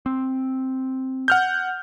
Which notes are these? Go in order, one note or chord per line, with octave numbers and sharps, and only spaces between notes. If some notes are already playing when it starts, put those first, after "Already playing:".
C4
F#5 F6 G6